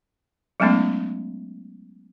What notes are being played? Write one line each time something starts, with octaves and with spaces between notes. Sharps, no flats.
F#3 G#3 A3 B3 C#4 D#4